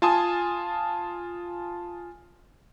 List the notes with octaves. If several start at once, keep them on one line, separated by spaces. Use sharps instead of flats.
F4 G#5 A5 C6 D#6